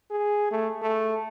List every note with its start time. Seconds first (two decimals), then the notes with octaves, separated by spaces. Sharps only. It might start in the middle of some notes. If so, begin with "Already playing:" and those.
0.11 G#4
0.51 A3
0.82 A3